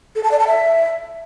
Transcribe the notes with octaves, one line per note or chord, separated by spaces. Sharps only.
A4
A5
D5
A5
E5